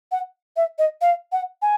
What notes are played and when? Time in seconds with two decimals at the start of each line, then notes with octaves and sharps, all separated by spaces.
0.11 F#5
0.56 E5
0.78 D#5
1.01 F5
1.32 F#5
1.62 G#5